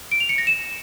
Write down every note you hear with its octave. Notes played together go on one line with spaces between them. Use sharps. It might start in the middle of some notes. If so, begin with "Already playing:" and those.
D7
F7
C#7
A#6
E7